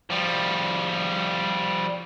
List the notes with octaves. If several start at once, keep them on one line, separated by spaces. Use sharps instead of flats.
F3 G3